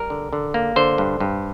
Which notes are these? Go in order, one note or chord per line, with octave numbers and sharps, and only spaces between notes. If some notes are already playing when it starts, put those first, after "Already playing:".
Already playing: G3 A#4
D3
D3
A#3
D3 C5
G2
G2